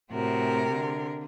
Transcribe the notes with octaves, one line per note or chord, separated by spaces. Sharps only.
A2 C3 C4 F#4 A#4
D3